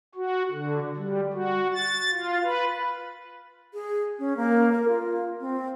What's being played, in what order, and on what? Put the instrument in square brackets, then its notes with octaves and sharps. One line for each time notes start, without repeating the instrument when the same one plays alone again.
[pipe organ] F#4
D3
G3
F#4
A6
F4
B4
[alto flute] G#4
C#4
A#3
A#4
F4
C4